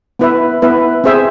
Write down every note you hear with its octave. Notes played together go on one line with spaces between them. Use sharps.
B3 E4 B4 E5
B3 E4 B4 E5
C4 G#4 C5 E5